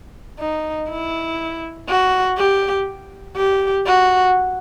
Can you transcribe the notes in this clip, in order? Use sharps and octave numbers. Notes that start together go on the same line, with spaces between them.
D#4
E4
F#4
G4
G4
F#4